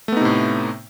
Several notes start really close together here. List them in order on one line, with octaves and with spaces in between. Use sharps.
A3 B3 D#4 C3 A2